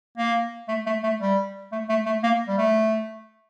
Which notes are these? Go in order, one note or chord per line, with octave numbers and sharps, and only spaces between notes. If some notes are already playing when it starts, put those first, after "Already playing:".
A#3
A3
A3
A3
G3
A3
A3
A3
A#3
G3
A3